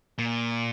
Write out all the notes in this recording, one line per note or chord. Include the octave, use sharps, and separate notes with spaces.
A#2